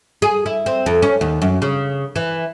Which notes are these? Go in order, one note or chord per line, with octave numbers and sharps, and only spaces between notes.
G#4
E4
C4
F2
C#4
D#2
F#2
C#3
E3